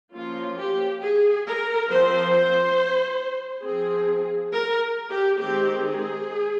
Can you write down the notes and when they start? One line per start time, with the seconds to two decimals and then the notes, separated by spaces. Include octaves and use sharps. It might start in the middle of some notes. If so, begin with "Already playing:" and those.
0.14 F3 A#3 C#4 F4
0.58 G4
1.02 G#4
1.45 A#4
1.89 F3 C4 C5
2.34 C5
3.64 F3 C4 G#4
4.52 A#4
5.11 G4
5.40 D#3 G#3 C4 G4
5.84 G#4